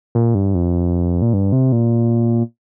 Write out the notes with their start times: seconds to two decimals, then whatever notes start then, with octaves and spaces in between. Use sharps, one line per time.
0.15 A#2
0.35 G2
0.55 F2
1.22 A#2
1.33 G2
1.52 C3
1.72 A#2